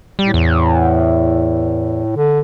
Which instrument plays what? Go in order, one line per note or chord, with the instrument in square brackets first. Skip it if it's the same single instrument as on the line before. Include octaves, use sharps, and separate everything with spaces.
[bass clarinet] A2 [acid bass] G3
[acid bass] E2
[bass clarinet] D3